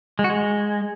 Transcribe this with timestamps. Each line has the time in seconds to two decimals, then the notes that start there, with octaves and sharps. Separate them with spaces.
0.19 G#3
0.24 F#4
0.30 G#3